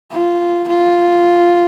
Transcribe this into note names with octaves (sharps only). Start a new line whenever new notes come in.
F4
F4